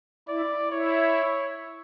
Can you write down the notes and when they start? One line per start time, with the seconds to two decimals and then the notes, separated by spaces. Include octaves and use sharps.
0.28 E4 D5
0.71 E4 C#5